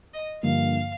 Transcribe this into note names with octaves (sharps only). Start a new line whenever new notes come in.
D#5
G2 D3 F3 A#3 F5